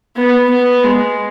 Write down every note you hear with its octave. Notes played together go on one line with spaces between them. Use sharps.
B3
B3
G#3